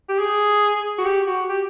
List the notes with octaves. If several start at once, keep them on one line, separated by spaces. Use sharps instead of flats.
G4
G#4
F#4
G4
F#4
G4